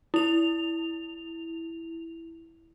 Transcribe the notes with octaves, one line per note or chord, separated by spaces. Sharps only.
E4 F7